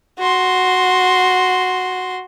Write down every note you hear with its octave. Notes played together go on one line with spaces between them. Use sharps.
F#4 C6